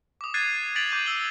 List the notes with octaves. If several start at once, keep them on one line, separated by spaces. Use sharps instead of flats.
D6 D#6
F#6 G#6 A6 C7 D#7
A6 B6 D7 F7 F#7
D6 G6 D#7
E6 F#7 G7